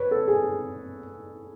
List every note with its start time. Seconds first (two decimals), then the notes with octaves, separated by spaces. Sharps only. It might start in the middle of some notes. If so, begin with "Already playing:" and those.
Already playing: B4 C#5
0.11 A4
0.28 G#4